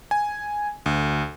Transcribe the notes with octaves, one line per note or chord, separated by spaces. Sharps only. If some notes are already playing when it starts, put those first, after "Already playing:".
G#5
D2